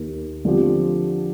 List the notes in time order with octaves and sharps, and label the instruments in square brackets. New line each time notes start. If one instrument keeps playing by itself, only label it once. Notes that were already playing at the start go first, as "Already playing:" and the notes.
Already playing: [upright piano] D#2 D#3 A#3
D3 F3 C4 G4